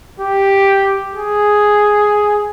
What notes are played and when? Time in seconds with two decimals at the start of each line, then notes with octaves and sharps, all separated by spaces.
0.20 G4
1.14 G#4